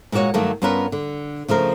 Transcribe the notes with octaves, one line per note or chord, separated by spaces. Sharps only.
A#2 G#3 A#3 F#4 C#5
G2 D#3 F#3 A3 A#3
G2 B3 C#4 F4 A#4 B4
D3
C#3 F3 A3 A#4